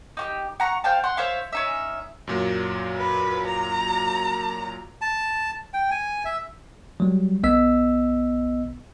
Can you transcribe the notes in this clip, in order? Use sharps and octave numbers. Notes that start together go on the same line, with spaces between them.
D#4 F#4 G4
F#5 A#5 C#6
C5 F5 G5 A5
F#5 C6 F#6
C5 C#5 E5 F5
C#4 D#4 E5
F#2 A#2 F#3
B4
A#5
A5
G5
G#5
E5
F#3 G3
B1 B3 D#5 E6 B6